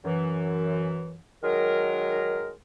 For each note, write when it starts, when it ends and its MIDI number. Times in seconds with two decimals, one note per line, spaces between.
0.05 1.18 42
0.05 1.18 52
1.43 2.52 51
1.43 2.52 54
1.43 2.52 56
1.43 2.52 63
1.43 2.52 70